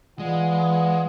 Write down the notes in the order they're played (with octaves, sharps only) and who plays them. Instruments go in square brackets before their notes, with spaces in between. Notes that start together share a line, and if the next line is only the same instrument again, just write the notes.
[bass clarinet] E3 [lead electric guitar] G#3 [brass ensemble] F4 D5 F#5